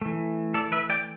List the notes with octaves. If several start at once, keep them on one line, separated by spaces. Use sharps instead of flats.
E3 A3
A4 D5
B4 E5
D5 G5